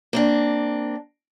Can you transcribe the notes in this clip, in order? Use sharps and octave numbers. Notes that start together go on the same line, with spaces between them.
A#3 C4 D4